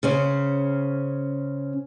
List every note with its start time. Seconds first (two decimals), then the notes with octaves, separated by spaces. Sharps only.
0.03 C#3 C#4 C5